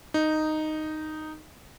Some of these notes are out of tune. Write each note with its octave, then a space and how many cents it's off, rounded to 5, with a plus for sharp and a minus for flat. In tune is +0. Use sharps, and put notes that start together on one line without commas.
D#4 -5